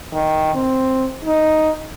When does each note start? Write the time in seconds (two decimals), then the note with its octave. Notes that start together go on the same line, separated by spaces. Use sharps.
0.12 D#3
0.54 C4
1.25 D#4